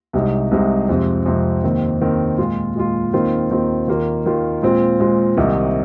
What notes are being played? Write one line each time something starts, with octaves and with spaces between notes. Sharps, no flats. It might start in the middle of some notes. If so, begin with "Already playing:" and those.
C2 C3 G#3 D#4
C2 C3 G#3 D#4
F2 C3 G#3 C4
F2 C3 G#3 C4
D#2 D#3 C4
D#2 D#3 C4
A#2 G#3 F4
A#2 G#3 F4
D#2 D#3 C4 F4
D#2 D#3 C4 F4
D#2 D#3 A#3 F4
D#2 D#3 A#3 F4
A#2 G#3 C4 F4
A#2 G#3 C4 F4
C2 C3 D#3 C4 D#4